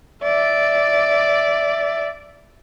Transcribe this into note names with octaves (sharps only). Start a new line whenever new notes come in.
D5 E5